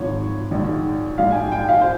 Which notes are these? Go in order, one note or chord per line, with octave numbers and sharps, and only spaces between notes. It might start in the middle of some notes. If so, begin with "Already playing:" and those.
Already playing: G#1 G#2 F3 C#5
A#1 G#2 D#3
A#1 G#2 F3 F5
G#5
G5
G5
F5
C5